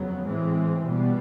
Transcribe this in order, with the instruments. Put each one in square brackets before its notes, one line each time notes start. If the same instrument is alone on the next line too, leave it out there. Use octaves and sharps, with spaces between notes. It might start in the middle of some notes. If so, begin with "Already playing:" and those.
Already playing: [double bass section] F2 C#3 F#3 B3
A2 E3 G#3 C4
B2 G3 B3